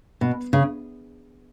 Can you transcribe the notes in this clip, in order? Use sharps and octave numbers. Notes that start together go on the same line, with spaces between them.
B2
C#3